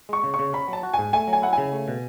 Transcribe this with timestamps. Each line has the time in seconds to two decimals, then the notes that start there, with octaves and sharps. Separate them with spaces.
0.09 G#3 C#6
0.23 C#3
0.34 C#6
0.39 C#3
0.53 C#4 B5
0.68 F#3 A5
0.83 F#4
0.94 G#2 G#5
1.13 A3 G#5
1.28 F#3
1.33 G#5
1.42 E4 F#5
1.53 C#3 G#5
1.73 A3
1.88 B2